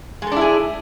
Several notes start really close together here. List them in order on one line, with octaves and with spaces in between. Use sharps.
G#3 A4 D4 E4 G#4